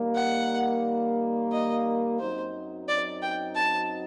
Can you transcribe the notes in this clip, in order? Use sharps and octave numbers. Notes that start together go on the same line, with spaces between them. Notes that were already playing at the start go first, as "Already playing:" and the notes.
Already playing: D#3 G3 A#3
F#5
D#5
F#2 F#3 C4 D#4 C5
D5
G5
A5